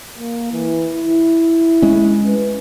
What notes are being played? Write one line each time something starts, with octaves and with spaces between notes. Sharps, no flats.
A#3
E3
E4
G#3 C#4
B4